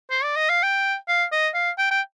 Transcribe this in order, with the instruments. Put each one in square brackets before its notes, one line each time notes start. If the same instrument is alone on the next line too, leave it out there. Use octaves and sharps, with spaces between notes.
[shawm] C5
D5
D#5
F5
G5
F5
D#5
F5
G5
G5